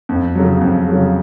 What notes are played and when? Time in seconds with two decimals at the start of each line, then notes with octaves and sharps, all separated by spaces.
0.09 F2
0.35 C#3 F#3
0.61 F2
0.89 C#3 F#3